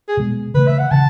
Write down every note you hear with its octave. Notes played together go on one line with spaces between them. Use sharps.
G#4
B2 G#3 B3
C#3 E3 A3 B4
E5
F#5
C#3 E3 A5